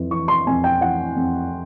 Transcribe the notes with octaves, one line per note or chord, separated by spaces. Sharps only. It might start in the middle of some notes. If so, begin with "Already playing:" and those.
Already playing: F2 E3
E3 C#6
C6
F2 G#5
G5
E3 F#5
F2